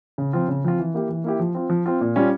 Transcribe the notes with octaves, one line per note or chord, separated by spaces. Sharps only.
C#3
F3 C4 F4
C#3
F3 C4 F4
E3
A#3 E4 G4
E3
A#3 E4 G4
F3
C4 F4
F3
C4 F4
A#2
G3 C#4 F4